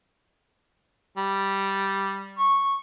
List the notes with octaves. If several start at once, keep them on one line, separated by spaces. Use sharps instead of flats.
G3
C#6